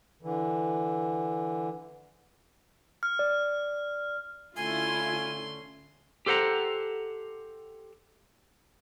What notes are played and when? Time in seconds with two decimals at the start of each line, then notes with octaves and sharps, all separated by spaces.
0.22 D3 E3
3.03 F6
3.19 D5
4.56 D3 A3 C#4 E4 F4 G#5 C6
6.26 G4 A4 C5 F#5 A#5